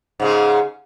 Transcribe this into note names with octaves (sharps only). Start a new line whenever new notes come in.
G#2 C#3 G#3